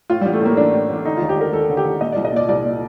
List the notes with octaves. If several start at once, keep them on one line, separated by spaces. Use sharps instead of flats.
A2 F4
A1 G3
A3
A2 A#3
A1 D4
A2
A1
D3 D#4
D#2 F4
G4
D3 A#4
D#2 A4
D3
G4
D#2
A#2 D#5
C2 D5
D#5
A#2 D5
C2 D5
A#2